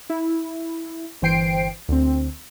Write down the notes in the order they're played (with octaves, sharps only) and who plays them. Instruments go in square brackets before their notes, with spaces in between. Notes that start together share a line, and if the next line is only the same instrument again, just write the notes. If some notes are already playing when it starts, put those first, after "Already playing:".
[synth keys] E4
G1 E3 C5 G5 C7 D7
D2 C4